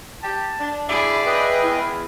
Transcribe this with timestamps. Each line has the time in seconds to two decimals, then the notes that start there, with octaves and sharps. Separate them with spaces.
0.22 G4 A5
0.59 D4
0.89 D2 E4 G#4 D5 E5
1.26 B4 D#5 G5
1.63 E2 E4